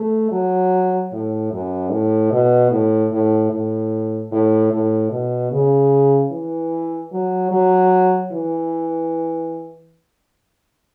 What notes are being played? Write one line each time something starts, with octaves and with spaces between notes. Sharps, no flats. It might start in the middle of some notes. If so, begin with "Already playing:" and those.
Already playing: A3
F#3
A2
F#2
A2
B2
A2
A2
A2
A2
A2
B2
C#3
E3
F#3
F#3
E3